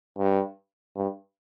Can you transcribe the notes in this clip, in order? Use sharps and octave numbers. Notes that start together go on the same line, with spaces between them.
G2
G2